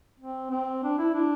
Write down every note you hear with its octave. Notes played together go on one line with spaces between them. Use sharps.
C4
C4
D4
E4
D4